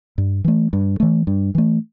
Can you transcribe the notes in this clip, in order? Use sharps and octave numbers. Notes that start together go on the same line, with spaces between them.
G2
E3 A3
G2
E3 A3
G2
E3 A3